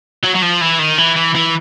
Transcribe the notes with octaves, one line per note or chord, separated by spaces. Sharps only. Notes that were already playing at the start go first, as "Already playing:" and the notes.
F#3
F#3
F3
E3
D#3
E3
E3
E3